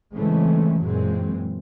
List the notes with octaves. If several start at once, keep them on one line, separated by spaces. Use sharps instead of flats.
C#3 E3 G#3 A3 C4 C#4
F#2 A#2 E3 F#3 G#3 C4